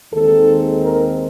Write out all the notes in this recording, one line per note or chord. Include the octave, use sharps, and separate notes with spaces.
D#2 D#3 G#3 C4 D#4 A4
A#4